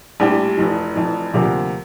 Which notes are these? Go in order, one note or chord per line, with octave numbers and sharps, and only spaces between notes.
A#1 A2 G3 D4 G4
F1 F2 E3
F1 F2 E3
D2 C3 F3 A#3